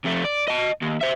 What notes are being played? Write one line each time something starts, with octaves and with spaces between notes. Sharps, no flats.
F2 A3
D5
D#5 A5
D#2
C5 E5